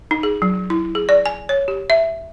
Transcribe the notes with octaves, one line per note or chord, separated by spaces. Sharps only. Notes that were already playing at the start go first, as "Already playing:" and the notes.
D#4
G#4
F#3
E4
G#4
D5
G#5
C#5
G4
E5